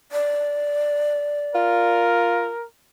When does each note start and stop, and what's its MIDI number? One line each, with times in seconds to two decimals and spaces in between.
0.12 2.01 74
1.55 2.51 65
1.55 2.66 70